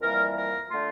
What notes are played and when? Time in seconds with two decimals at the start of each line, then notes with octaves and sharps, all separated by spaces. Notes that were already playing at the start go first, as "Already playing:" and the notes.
0.01 F2 E3 G3 A#3 A#4
0.36 A#4
0.69 D3 A3 F4